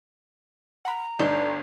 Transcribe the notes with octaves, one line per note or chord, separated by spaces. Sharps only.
F#5 A#5 B5
G1 D2 G2 D4 D#4 A4 G6